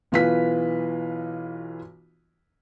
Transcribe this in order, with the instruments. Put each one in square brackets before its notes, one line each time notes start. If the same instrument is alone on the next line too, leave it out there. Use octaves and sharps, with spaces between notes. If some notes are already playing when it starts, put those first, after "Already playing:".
[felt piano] B1 E3 F4 B4 B6